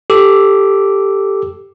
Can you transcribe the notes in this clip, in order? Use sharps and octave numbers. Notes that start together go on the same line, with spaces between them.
G4 A4 D6 E6